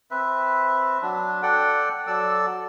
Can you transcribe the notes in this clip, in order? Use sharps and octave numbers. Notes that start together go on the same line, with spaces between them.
C4 B4 E5
F#3 D4
A4 D5 F#5 G5
F#3 A4 D5 E6